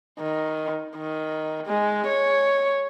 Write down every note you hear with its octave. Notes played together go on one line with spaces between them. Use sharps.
D#3
D#3
G#3
C#5